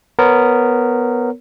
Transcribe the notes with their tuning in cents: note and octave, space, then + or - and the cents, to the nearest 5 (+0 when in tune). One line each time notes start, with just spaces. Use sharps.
B3 +0 A#4 -10 C#5 +0